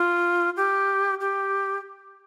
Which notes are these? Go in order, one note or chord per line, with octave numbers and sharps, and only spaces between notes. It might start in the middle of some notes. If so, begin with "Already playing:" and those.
Already playing: F4
G4
G4